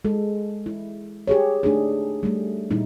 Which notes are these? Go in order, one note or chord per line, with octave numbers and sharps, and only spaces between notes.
G#3 A4
E4
G4 G#4 C#5
A3 D4 D#4 G#4
G3 A3
A#2 G3 D#4 E4